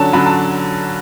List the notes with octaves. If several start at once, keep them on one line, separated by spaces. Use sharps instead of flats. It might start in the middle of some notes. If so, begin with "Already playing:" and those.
Already playing: D3 F#3 C#4 A5
D3 F#3 C#4 B5
A5